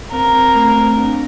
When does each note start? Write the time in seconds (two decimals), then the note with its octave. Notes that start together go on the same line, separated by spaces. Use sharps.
0.12 C4 A#4
0.33 C4
0.55 A3
0.76 C4
0.97 D4